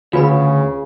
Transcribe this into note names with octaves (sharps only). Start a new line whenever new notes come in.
D2 C#3 F4 B4 B5